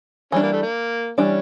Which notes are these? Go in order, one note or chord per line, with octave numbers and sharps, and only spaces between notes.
E3 G3 C#4 D4
A#3
A3
A#3
E3 G3 C#4 D4